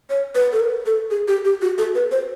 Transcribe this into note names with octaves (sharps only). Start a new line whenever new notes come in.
C#5
B4
A4
A#4
A4
G#4
G4
G4
F#4
A4
B4
C5